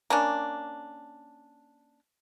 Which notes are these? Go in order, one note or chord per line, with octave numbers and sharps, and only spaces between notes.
A#3 C#4 D4